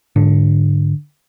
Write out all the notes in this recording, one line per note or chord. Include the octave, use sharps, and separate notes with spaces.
G#2 D3 D4